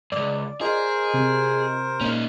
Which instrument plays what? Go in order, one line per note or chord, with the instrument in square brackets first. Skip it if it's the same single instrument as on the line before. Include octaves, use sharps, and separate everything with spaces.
[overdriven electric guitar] C#2 F#2 [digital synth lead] D5 [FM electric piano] D6
[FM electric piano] F4 D#5 [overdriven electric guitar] G#4 [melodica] A#4 C5
[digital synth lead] C3
[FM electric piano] A#2 A#3 [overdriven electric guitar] C#4 D#4